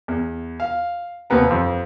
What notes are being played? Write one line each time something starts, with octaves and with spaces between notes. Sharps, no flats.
E2
F5
D#2 C3 B3 A#5
F2